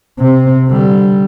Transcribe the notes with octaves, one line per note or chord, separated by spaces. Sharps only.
C3 C4
D3 G3